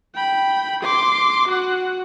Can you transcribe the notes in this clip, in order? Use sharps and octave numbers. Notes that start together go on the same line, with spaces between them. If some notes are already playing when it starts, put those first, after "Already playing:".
G5 B5
C6 D6
F#4 F#5